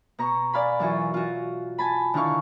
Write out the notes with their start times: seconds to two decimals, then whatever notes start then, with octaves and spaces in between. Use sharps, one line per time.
0.19 B2 A#5 C#6
0.53 D5 F5 G#5 B5
0.79 F#2 E3 F4 F#4 C#6
1.14 F4 F#4
1.78 G#5 A5 B5
2.14 D3 D#3 D#4 E4 F5 C#6